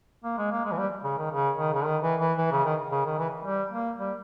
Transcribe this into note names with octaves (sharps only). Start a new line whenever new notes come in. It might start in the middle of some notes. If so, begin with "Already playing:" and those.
A#3
G#3
A#3
G#3
E3
G3
C#3
D#3
C#3
D#3
C#3
D#3
E3
E3
E3
C#3
D#3
C#3
D#3
E3
G3
A#3
G3